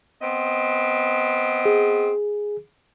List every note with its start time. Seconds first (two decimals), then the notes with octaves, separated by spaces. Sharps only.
0.22 B3 C4 D#5
1.65 G#4